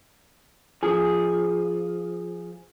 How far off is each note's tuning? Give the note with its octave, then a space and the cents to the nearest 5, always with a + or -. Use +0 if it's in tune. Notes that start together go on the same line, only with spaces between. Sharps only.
F3 +0 G#4 +0